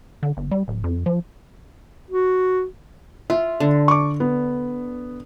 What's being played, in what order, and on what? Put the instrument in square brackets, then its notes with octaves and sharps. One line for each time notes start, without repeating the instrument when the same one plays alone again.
[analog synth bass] D3
G1
G3
D1
F2
F3
[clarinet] F#4
[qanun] F4 [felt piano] E5
[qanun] D3
[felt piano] C#6 D6
B3